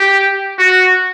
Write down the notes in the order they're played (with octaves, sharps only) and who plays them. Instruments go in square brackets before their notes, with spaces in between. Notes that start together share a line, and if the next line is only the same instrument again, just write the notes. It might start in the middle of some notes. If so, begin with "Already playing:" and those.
Already playing: [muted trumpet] G4
F#4